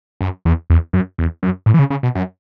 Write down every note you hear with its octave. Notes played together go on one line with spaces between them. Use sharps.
F#2
E2
E2
F#2
E2
F#2
A2
E3
C#3
C#3
B2
F#2